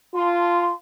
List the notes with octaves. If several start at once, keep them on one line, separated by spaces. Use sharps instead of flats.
F4 A5 C6